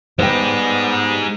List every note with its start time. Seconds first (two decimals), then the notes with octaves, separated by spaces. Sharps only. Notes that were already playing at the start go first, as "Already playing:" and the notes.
0.19 G3 G#3 B3 D#4 C5 G5